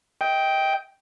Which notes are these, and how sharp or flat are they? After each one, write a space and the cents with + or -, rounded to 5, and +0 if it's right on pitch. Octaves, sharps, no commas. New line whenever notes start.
D#5 +30 G5 +0